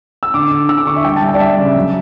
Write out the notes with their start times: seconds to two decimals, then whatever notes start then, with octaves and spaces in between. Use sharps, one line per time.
0.23 E6
0.34 D3 D6
0.51 D3
0.69 D3 E6
0.78 D6
0.87 D3 C#6
0.96 E5
1.04 G3 G5
1.16 A5
1.23 G3
1.28 G5
1.34 D5
1.40 G3 E5
1.58 C#3
1.76 F#3